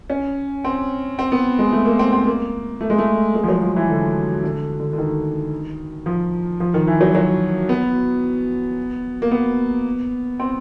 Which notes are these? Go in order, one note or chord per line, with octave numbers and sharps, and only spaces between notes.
C#4
C4
C4
B3
G#3
A3
A#3
C4
C4
A#3
A3
G#3
A3
G#3
F3
F#3
F3
E3
D3
D3
D3
D3
D#3
F3
F3
D#3
E3
F#3
F#3
B3
A#3
B3
C4